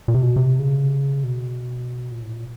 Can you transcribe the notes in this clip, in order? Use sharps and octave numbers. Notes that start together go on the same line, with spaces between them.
A#2
C3
B2
C3
C#3
B2
A#2
A2
A#2